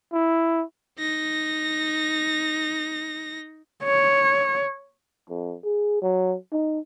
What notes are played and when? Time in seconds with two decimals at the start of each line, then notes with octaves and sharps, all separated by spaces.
0.13 E4
0.99 D#4 A#6
3.84 C#5
5.29 F2
5.64 G#4
6.02 F#3
6.52 D#4